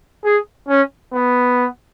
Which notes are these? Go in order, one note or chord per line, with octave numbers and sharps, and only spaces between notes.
G#4
C#4
B3